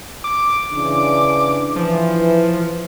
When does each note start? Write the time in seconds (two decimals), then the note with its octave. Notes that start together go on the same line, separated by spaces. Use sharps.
0.24 D6
0.74 C#3 E3 D4
1.76 E3 F3